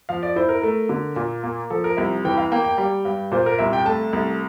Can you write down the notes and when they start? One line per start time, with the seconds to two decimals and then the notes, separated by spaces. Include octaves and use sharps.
0.09 F3 F5
0.23 D5
0.36 E4 C5
0.49 A#4
0.62 A3 A#4
0.89 D3
1.16 A#2
1.43 A#3
1.70 F3 A4
1.84 A#4
1.97 C2 E5
2.25 E3 G5
2.38 F5
2.52 A#3 G5
2.64 G5
2.78 G3
3.05 G2
3.32 A#2 C5
3.46 A#4
3.59 C2 E5
3.73 G5
3.85 A3 A5
4.13 C2